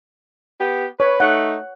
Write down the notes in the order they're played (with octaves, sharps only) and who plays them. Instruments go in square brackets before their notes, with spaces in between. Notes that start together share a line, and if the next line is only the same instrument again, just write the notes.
[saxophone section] B3 G4
[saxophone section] B4 [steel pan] C#5
[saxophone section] A3 D#4 [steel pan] F#5